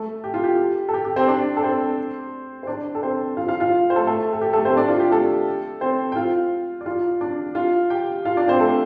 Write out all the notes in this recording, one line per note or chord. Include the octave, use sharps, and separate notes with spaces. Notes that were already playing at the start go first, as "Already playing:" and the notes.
Already playing: A3 A4
G4
F4
G4
A4
G4
G4
C4 C5
D4 D5
A4
C4 C5
C5
D4 D5
A4
C4 C5
F4 F5
F4 F5
F4 F5
C5
A3 A4
A3 A4
A4
G4
A3 A4
C4 C5
D4 D5
F4
G4
A3 A4
C4 C5
G5
F4 F5
D5
F4 F5
D4 D5
F4 F5
G4 G5
F4 F5
D4 D5
C4 C5
A3 A4